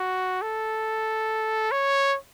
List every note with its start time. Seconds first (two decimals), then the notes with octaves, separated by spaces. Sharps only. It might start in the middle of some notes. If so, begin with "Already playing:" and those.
Already playing: F#4
0.42 A4
1.72 C#5